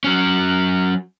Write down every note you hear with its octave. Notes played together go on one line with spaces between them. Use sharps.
F#3 C#4